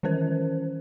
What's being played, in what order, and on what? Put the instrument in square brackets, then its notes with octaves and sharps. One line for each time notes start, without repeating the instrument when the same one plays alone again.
[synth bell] D#3 E3 C#4 A#4 C5